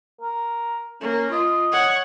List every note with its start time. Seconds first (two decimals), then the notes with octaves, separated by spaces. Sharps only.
0.21 A#4
1.01 A#3 C#4
1.32 F4 D#5
1.72 C#5 F#5